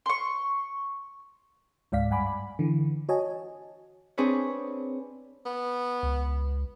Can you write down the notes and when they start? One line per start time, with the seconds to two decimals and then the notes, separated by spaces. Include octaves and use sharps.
0.06 C6 C#6
1.92 C#2 G#2 D5 F5 B6
2.10 G2 F#5 G#5 B5 D6
2.27 B5
2.59 D3 E3
3.09 F#4 C#5 D#5 G#5 A5
4.18 C4 D4 G#4 B4 C#5
5.46 B3
6.03 C#2